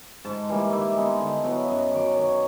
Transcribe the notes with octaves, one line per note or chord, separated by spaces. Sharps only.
G#2 A5
E3 G3 A#3
D#3 E5
G#3 B3 D#4
D3
F#3 B3 E4
F#2 D#5
D#3 F#3 D5
D#3 C#5